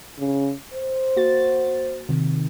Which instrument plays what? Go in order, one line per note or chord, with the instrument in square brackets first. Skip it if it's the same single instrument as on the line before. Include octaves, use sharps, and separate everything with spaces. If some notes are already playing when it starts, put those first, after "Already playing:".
[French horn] C#3
C5
[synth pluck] A#3 F#4 A6
C3 D#3